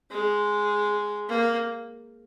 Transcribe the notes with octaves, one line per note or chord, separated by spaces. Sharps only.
G#3
A#3